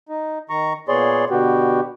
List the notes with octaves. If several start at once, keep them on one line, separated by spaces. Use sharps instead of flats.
D#4
D#3 A#5 C#6
A#2 B3 G#4 C#5 D5 C6
B2 D3 B3 F#4 G4